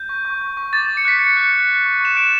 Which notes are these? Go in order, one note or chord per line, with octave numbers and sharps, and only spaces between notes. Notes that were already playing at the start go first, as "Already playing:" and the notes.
Already playing: G6
C#6
C#6
C#6
C#6
D6 A6
D6
C#7
F#6 B6
F#6 C#7
F#6
F#6
F#6
C#6
C#6 E7
F#6 D7